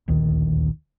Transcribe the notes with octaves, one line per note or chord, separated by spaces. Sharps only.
D1 A#1 D#2 D#3